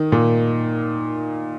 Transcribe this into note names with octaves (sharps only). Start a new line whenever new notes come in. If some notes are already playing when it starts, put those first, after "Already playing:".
Already playing: D#3
A#2